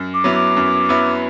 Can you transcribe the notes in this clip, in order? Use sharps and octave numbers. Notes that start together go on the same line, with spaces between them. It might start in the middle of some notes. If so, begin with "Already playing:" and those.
Already playing: F#2
D6
F#3 B3 E4
D6
F#2
F#3 B3 E4